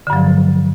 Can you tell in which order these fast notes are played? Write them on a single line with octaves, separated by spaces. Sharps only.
D3 G2 F#3 F3